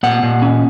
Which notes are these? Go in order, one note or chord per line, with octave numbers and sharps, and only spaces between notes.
A#2 F#5
A#2
C#4